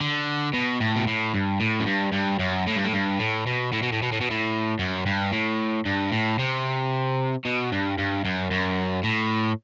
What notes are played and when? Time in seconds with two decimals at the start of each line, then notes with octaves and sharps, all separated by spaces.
0.01 D3
0.54 B2
0.80 A2
0.96 B2
1.07 A2
1.34 G2
1.60 A2
1.80 F#2
1.87 G2
2.13 G2
2.39 F#2
2.67 A2
2.76 G2
2.84 A2
2.93 G2
3.19 A2
3.47 B2
3.73 A2
3.83 B2
3.93 A2
4.03 B2
4.12 A2
4.21 B2
4.31 A2
4.79 F#2
5.06 G2
5.32 A2
5.85 G2
6.12 A2
6.39 C3
7.45 B2
7.72 G2
7.98 G2
8.25 F#2
8.51 F#2
9.04 A2